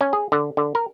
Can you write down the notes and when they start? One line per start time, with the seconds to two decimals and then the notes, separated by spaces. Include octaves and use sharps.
0.01 C#4
0.13 G#4
0.32 D3
0.57 D3
0.75 A#4